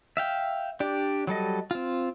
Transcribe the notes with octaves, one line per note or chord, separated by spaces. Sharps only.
E5 F5 G5
D4 G4 D5
F#3 G3 A4 D#5
C4 F4